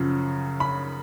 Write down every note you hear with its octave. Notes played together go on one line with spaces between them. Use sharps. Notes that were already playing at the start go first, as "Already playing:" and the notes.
Already playing: F#2 C#3 F3
B5